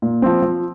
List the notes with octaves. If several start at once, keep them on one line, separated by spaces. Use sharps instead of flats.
A#2
F3 C4
F3